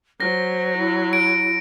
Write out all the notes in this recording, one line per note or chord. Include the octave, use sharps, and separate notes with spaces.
F#3 C5 A#6
E4
D7